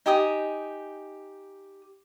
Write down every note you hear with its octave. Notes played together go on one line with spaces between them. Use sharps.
D#4 G4 G#5 D#6